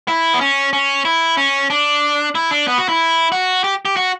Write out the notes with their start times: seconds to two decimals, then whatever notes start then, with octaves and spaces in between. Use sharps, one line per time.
0.08 E4
0.34 B3
0.41 C#4
0.73 C#4
1.05 E4
1.37 C#4
1.70 D4
2.35 E4
2.51 D4
2.68 B3
2.78 F#4
2.89 E4
3.32 F#4
3.64 G4
3.85 G4
3.97 F#4